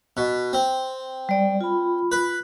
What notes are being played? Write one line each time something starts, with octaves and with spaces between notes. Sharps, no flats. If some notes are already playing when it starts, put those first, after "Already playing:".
B2
C4
G3 D5
F4 B5
B4